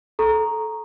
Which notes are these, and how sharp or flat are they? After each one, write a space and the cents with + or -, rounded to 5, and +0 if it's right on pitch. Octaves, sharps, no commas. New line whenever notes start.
A4 -15 A#5 +0 C#6 -10